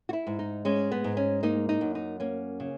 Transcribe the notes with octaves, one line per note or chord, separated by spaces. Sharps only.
F#4
E4
G#2
D#4
G#3 C#4
B3
G#2
C#4
A#3 D#4
D#4
F#2
D#4
A#3 C#4
C#3